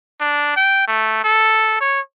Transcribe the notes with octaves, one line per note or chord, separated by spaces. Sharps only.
D4
G5
A3
A4
C#5